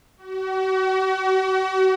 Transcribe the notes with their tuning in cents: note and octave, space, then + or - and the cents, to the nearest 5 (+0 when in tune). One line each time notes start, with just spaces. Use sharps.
F#4 +40